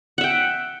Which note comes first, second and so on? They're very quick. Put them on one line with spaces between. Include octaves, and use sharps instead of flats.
F#5 E5 G5